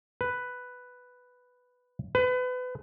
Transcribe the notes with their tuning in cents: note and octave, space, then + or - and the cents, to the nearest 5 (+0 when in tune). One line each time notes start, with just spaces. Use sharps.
B4 +5
B4 +30